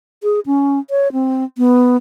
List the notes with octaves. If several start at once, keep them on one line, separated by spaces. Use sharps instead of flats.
G#4
C#4
C#5
C4
B3